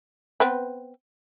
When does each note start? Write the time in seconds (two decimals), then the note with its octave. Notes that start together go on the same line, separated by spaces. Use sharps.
0.40 B3 C4 B4